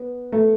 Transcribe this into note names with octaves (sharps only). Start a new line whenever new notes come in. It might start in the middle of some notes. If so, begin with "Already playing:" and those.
Already playing: B3
A3